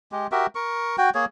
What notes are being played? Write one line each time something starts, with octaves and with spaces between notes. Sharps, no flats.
G#3 G4
F#4 G4 A#4 E5
A#4 C#6
F#4 G5
A#3 G#4 C#5